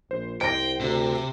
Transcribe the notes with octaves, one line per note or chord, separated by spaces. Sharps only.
A#1 C5
C2 C5 G5 A#6 D7
D2 C3